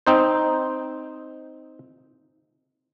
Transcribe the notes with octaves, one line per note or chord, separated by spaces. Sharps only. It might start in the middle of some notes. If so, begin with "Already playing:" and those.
C4 D#4 C5